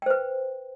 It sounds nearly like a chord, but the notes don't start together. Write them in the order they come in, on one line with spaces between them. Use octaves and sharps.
G5 C5 B4